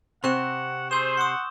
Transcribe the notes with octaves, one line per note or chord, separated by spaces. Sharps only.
C3 C4 F#5 C#6 F#6 E7
G#4 C5 E6 G6 E7
F#5 C6 C#6 D#6